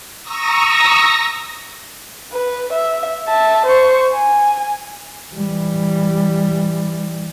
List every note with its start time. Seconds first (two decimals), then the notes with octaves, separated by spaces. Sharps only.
0.23 A#5 C#6 D#6 E6 A#6
2.32 B4
2.73 E5
3.28 E5 A5
3.66 C5 C#6
4.12 G#5
5.33 E3 G3